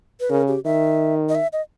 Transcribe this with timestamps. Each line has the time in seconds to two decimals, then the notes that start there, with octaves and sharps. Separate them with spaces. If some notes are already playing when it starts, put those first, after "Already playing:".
0.20 B4
0.30 C#3 A#4
0.48 G4
0.65 D#3 E5
1.29 D#5
1.35 E5
1.53 D#5